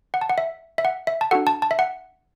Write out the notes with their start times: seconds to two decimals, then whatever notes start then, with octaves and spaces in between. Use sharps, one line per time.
0.14 F#5
0.21 A5
0.30 F#5
0.38 E5
0.78 E5
0.85 F#5
1.07 E5
1.21 A5
1.31 D4 F#4 A4 F#5
1.47 A5
1.62 A5
1.71 E5
1.79 F#5